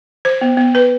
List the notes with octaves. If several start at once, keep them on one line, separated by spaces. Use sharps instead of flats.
C5
B3
B3
B4